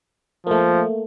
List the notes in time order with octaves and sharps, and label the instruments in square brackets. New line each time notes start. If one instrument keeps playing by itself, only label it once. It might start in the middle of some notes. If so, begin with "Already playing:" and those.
[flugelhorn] F3 [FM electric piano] A3 A#3